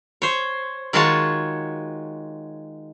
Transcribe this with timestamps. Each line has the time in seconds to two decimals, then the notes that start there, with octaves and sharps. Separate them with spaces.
0.22 C5 C#5
0.93 D#3 G#3 F4 F#4 C#5 A5